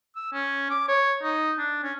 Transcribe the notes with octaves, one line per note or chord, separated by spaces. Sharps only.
E6
C#4
D6
C#5
D#4
D4
C#4